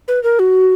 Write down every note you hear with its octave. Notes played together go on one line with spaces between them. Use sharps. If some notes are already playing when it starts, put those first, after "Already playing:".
B4
A#4
F#4